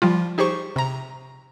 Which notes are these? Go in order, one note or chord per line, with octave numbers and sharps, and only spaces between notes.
F3 G3 F4
D#4 G4 G#4 C5 C#6
C3 A#5